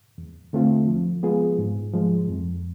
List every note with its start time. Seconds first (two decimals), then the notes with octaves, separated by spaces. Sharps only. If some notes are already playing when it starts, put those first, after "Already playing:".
0.18 E2
0.53 D3 A3 C4 F4
0.88 F3
1.23 G#3 B3 F4 G#4
1.59 G#2
1.93 F3 G#3
2.29 F2